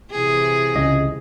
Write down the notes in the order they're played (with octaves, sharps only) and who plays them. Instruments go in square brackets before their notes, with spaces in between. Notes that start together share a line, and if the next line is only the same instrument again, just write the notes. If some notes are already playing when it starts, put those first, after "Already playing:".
[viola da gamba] C3 E3 G#4
[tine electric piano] C#2 C#3 D#5